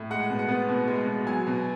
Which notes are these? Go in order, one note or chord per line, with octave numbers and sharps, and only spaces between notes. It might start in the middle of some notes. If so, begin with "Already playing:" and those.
Already playing: A2
G#3 F#5
B2
F#5
B3
B2
G#3
B2
F#3 G#5
B2